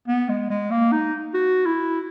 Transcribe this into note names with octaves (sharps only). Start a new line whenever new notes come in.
B3
G#3
G#3
A#3
D#4
F#4
E4